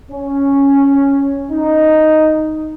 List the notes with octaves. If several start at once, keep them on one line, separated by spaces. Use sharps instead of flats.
C#4
D#4